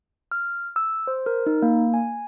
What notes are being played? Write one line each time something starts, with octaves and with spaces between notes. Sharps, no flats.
F6
E6
C5
A#4
D#4
A#3
G#5